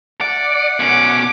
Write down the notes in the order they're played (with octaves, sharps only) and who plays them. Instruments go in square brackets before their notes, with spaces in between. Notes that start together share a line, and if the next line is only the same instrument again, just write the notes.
[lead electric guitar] D5 [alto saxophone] F#5
[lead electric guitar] B2 C#4 [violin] D6